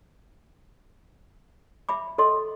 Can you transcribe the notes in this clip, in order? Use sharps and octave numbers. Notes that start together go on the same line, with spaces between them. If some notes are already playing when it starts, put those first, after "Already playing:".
E5 B5 D6
A4 D#5 C6